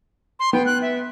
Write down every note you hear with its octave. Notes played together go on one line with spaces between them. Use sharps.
C6
B3 G5
F#6
E5